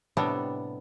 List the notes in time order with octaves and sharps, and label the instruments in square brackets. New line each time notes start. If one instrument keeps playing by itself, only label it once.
[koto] A2 C3 G3 B3 D4 A4